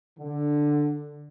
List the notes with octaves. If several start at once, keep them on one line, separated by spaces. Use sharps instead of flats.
D3